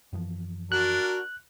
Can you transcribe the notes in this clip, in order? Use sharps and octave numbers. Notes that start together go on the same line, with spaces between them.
F#2 E3 F3
D4 F#4 A#4 F#6